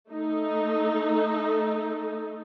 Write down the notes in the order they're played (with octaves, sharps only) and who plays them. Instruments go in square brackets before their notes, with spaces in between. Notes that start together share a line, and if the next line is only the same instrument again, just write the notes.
[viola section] A3 D#4 A4